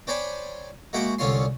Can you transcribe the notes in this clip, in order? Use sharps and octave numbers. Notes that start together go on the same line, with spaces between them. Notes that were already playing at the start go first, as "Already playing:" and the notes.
D4 C5 C#5 G5 G#5 B5
G#3 A#3 F#4 E5 F#5 G5
C2 D3 C#4 F4 C#5 C6